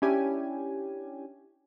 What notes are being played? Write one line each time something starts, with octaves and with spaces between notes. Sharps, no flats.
C#4 D4 E4 G4 G#5